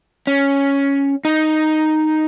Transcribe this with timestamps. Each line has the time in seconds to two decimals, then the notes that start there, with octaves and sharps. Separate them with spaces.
0.27 C#4
1.25 D#4